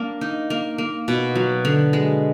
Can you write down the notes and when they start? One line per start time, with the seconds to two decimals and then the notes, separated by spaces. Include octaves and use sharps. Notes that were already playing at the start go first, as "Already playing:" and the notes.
Already playing: A#3 D4
0.21 D#4
0.50 A#3
0.78 A#3
1.08 B2
1.35 F#3
1.65 D3
1.93 G#3